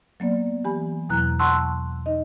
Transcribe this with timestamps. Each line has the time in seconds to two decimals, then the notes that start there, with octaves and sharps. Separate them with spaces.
0.20 F#3 A#3 B3 D5
0.65 E3 G4 G#5 B5
1.09 E2 B2 F#3 E4 A#5 F#6
1.39 F#5 A5 C6 C#6 E6 F#6
2.06 D#4 D#5